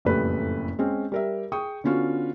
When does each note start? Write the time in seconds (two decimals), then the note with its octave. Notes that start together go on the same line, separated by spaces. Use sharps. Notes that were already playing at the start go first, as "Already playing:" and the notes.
0.05 F#1 F2 A2 G3 A3 B4
0.79 G#3 C4 C#4
1.12 G3 A#4 E5
1.52 G#4 G5 C#6 D#6
1.84 D3 B3 C#4 F4 F#4